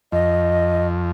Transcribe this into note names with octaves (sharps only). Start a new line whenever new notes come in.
F2 D#5